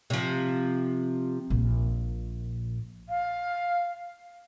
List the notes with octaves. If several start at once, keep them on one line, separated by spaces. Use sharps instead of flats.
C3 F3
A#1 A#2
F5